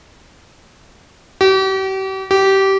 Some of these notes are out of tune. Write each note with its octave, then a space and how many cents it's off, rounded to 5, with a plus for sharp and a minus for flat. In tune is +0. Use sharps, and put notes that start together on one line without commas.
G4 -40
G4 -20